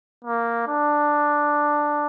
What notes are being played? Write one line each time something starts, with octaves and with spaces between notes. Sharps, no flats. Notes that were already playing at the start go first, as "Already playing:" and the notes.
A#3
D4